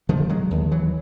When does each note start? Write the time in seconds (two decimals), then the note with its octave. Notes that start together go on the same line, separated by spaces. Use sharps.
0.09 D3 D#3 F3
0.29 F#3 G#3
0.51 D#2
0.71 E3 F#3